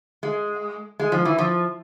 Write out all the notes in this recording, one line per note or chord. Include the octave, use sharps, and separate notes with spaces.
G#3
G#3
F3
E3
F3